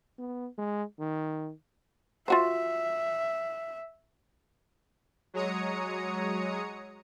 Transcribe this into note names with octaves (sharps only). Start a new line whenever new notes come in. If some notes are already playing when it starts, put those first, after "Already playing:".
B3
G#3
D#3
F4 F#4 C5 E5
F#3 G#3 C#5 A#5 D#6 C#7